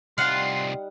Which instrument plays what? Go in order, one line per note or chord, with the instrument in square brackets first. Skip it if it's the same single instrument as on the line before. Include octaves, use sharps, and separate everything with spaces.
[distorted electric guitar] C2 F4 [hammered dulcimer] G3 D#4 [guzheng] F5 F#5 [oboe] C6